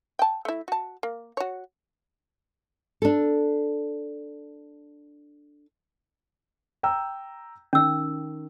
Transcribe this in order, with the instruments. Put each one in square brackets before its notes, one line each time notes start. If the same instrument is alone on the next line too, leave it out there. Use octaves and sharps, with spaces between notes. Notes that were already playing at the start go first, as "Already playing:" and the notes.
[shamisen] G5 A5
A3 E4
F#4 A5
A#3
F#4 C#5
[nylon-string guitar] D4 A4
[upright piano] G5 A#5 E6
[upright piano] D#3 [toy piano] C#4 E6